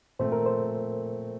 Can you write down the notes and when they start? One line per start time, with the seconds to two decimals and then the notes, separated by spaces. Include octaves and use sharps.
0.19 A#2 A3 C4 C5
0.32 A#4
0.46 C5